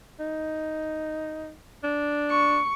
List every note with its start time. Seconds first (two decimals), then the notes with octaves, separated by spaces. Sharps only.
0.20 D#4
1.84 D4
2.30 C#6